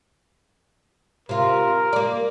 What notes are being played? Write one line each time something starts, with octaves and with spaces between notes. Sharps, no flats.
C3 F4 A#4
A#3 D5